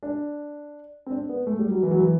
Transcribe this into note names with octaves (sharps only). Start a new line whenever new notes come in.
D4
C4
D4
B3
A3
G3
F#3
E3
F#3
E3